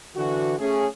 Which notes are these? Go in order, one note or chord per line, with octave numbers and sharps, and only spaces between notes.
D3 E3 F#4
A3 C#4 G#4